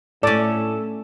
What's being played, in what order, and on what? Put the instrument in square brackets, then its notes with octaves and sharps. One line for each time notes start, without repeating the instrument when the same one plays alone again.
[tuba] A2 [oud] A3 C#4 [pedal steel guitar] A4 [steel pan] D5